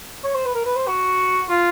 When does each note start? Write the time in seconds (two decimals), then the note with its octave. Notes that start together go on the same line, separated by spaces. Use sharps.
0.24 C#5
0.35 C5
0.46 B4
0.55 A#4
0.65 B4
0.76 C5
0.87 F#4
1.49 F4